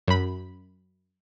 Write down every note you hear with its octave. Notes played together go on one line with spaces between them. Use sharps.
F#2 B5